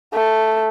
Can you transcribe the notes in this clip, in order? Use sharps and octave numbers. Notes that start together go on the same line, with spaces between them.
A3